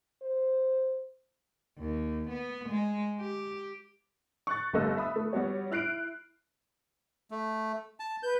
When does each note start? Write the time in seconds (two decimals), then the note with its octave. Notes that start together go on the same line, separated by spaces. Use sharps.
0.22 C5
1.79 D#2
2.30 B3
2.69 G#3
3.20 G4
4.47 C#6 F#6 A6
4.73 G1 G3 A3 D#5 E6
4.97 E5 B5 D#6
5.16 A3
5.33 G3 B3 F#4 C#5
5.71 E4 F6 F#6 C7 D7
7.31 A3
8.00 A5
8.23 B4 G6